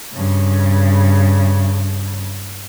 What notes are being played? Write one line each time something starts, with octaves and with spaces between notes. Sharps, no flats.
G2 C#3